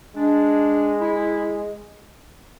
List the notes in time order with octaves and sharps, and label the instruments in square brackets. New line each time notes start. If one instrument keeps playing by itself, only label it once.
[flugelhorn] G#3 [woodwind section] D4
[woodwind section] E4